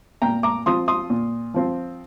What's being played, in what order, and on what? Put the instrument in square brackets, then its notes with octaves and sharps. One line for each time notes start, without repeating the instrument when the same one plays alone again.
[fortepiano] A#2 G5 A#5
A#5 D6
F3 C4 F4 C6 D#6
C6 D#6
A#2
F3 C4 F4